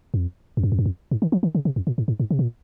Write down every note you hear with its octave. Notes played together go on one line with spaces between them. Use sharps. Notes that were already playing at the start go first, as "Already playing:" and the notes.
F2
F2
F#2
F2
F#2
F2
G#2
D#3
F3
D#3
C#3
C3
F2
A#2
G#2
G#2
G#2
C3
A#2